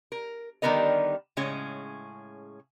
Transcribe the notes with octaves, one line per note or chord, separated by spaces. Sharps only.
A#4
D3 D#3 G3 B3 A#4 D#5
A2 C#3 G#3 C#4 G#4